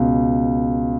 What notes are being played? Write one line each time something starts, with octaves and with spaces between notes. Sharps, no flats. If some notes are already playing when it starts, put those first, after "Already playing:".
Already playing: C#2 B2